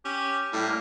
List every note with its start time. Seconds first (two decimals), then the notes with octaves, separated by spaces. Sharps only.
0.05 C#4 G4
0.53 A2 G3
0.67 A#3